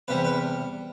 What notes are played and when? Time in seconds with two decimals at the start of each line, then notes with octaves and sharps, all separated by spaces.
0.08 E2 C3 G3 B4
0.25 B4